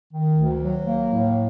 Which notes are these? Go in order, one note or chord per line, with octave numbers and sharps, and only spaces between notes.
D#3
D2
F#3
A#3
A2